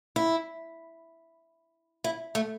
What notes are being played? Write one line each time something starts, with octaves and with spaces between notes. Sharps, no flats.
E4
E4
A3